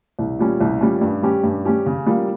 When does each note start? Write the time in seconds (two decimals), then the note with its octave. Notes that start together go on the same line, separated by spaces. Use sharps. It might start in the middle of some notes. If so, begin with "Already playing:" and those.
0.19 C2
0.39 A#2 G3 C#4
0.60 C2
0.81 A#2 G3 C#4
1.01 G2
1.22 G3 C#4 G4
1.43 G2
1.65 G3 C#4 G4
1.86 C#3
2.06 G3 A#3 F4